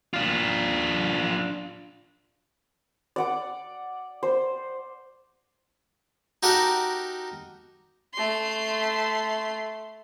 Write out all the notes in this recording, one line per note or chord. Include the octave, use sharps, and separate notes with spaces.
D4 F4
D5 F#5 D6
C5
D#4 F#4 G4 A4 A#4 F#5
A3 C6